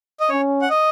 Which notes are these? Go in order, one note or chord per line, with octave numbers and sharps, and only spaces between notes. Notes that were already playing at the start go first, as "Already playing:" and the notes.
D#5
C#4 C#5
F#5
D#5